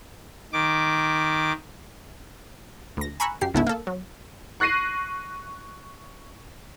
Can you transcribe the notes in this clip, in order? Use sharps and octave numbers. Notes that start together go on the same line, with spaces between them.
D#3 D6
D2 A#6
G#5 A#5 B5 C#6 E6 F#6
F#2 G4 C7
G1 C#2 G#2 A3 B3 E4
A#3 A4
F#3
C#6 F#6 A#6 C7 D#7